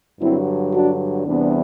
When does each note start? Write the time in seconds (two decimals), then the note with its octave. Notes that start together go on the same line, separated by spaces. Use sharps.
0.21 G2 D3 F#3 C4 E4
0.73 D4 F#4
1.26 E2 C3 E3 G3 B3 D4